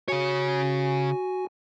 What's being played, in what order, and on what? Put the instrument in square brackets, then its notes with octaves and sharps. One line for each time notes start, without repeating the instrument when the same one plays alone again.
[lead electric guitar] C#3 C#5 [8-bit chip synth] F#4 G#5